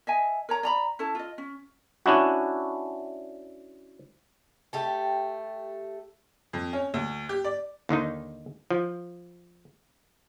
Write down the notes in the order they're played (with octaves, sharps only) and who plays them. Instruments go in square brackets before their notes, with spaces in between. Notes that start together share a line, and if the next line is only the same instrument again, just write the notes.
[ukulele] D#5 E5 G#5
A#4 C#5 A#5
D5 A#5 B5
C#4 E4 A4 A5
F4 D#5
C#4
[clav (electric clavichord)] C#4 D4 E4 F#4
[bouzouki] A3 G4 A5
[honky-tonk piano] F2
C#4
D2
G4
D5
[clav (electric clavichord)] D#2 D3 D#3 D#4
F3